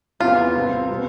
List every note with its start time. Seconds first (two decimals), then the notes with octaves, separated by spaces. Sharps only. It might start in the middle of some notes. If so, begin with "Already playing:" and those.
0.20 E2 C3 E3 B3 F4
0.55 C2 C3 G3 C4
0.89 B2 G3 B3